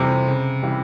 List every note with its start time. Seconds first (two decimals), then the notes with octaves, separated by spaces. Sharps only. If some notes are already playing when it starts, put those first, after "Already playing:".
Already playing: F2 C3 E3 G3 C4
0.28 C#3
0.63 E3 G3